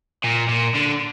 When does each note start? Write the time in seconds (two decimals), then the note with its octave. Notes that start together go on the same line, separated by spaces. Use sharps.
0.24 A#2
0.49 A#2
0.75 D3